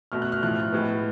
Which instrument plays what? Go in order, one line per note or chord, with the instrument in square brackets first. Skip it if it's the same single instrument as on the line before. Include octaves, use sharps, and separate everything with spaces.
[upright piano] B2 A3 F6
F#6
F6
A2 F3 A3 F#6
F#6
A2 G#3 B3